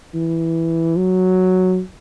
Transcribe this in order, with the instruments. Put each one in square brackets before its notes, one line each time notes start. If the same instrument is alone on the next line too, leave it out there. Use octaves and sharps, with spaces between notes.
[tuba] E3
F#3